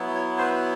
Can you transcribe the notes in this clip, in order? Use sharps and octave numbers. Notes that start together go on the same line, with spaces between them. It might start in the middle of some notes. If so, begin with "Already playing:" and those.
Already playing: F#3 B3 E4
C#5
C5
B4